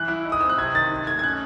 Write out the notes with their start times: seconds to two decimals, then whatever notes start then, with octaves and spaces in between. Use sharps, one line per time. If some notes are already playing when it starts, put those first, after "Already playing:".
Already playing: E3 F#6
0.08 E4
0.25 D#4
0.32 D#6
0.41 C4 E6
0.50 F#6
0.57 C3 G#6
0.74 D#3 A6
0.91 D#4
1.07 A3 G#6
1.19 G#6
1.23 C#4 F#6